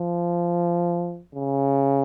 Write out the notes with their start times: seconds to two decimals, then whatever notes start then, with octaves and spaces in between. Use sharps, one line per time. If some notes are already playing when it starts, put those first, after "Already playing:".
Already playing: F3
1.35 C#3